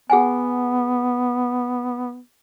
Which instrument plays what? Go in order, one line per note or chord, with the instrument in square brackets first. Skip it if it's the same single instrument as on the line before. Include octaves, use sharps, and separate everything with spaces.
[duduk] B3 [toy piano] G#4 F#5 G#5